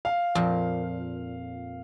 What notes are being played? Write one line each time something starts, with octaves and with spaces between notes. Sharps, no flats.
F5
F2 A#2